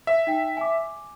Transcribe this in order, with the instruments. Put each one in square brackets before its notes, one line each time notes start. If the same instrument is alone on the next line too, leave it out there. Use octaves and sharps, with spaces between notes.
[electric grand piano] E5
[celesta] D#4 G5 B6
G#5 D6